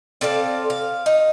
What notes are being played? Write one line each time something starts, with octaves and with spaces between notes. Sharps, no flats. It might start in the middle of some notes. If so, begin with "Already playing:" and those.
C4 A4 D5 F5
F5
D#4